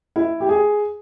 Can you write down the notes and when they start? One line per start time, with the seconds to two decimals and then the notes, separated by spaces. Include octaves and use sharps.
0.16 E4
0.40 G4
0.49 G#4